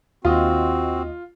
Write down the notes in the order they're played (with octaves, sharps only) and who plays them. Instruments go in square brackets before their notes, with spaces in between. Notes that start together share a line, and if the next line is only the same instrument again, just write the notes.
[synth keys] D#2 D#5 [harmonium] C4 F#4 [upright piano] F4